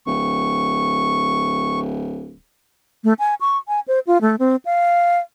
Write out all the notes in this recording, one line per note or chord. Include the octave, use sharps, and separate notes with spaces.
D1 C#6
A3
G#5
C#6
G#5
C5
F4
A3
C4
F5